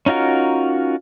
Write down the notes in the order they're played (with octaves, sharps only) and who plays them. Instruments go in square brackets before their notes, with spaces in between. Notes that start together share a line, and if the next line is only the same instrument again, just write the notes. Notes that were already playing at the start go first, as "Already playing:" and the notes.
[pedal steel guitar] C#4 D#4 F4 F#4 A#4